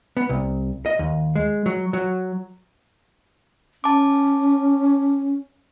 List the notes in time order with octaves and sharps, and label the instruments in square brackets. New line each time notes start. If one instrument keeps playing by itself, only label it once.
[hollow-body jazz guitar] B3
C2
D#5
D#2
G#3
F#3
F#3
[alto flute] C#4 [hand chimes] A5 D6